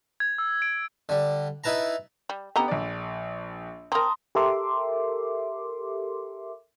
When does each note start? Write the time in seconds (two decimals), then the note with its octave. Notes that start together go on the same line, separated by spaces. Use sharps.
0.20 G#6
0.38 E6
0.62 D7
1.09 D3 G3
1.64 D#4 E4 B4 A5 A#5
2.30 G3
2.56 D3 B3 G4 D#5 A#5
2.68 A#1 D5
3.92 C4 A#4 A5 A#5 C6 D#6
4.35 G4 A4 A#4 E5 C6 D6